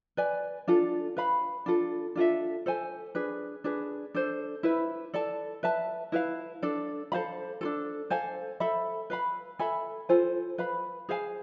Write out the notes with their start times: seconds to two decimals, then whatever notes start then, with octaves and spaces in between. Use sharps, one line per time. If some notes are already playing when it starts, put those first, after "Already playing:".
0.17 B4 D5 G#5
0.68 D4 F4 A4
1.17 B4 F5 B5
1.66 D4 F4 A4
2.16 D4 F4 A4 E5
2.66 A4 C5 G#5
3.15 D4 G#4 B4
3.64 D4 G#4 B4
4.14 D4 A4 C5
4.63 E4 B4 E5
5.14 A4 D5 A5
5.63 B4 E5 A5
6.12 E4 B4 F5
6.63 D4 A4 D5
7.12 A4 C5 F5 B5
7.61 D4 F4 A4
8.10 A4 C5 F5 G#5
8.60 A4 E5 B5
9.10 B4 F5 B5
9.59 A4 E5 G#5 B5
10.09 F4 A4 C5 G#5
10.58 B4 F5 B5
11.09 G#4 C5 F5 G#5